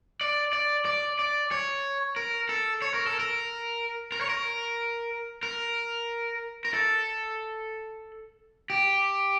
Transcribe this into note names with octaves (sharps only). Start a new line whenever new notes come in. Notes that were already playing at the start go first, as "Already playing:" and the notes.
D5
D5
D5
D5
C#5
A#4
A4
C#5
A#4
A4
A#4
A#4
C#5
A#4
A#4
A#4
A4
G4